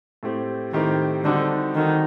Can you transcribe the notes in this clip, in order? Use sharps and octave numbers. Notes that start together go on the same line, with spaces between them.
A2 A3 C4 G4
A2 D#3 A3 C4 G4
D3 G3 C4 D#4 F#4 A4
D#3 G3 C4 D#4 F#4 A4